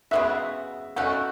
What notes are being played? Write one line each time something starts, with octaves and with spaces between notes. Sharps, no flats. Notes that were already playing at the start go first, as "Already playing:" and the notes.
C#3 G#3 B3 F#4 E5
B2 A3 C#4 F#4 F#5